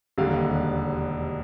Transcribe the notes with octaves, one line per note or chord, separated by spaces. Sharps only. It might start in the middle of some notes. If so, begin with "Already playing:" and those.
E1 D#2 D3 G3 F5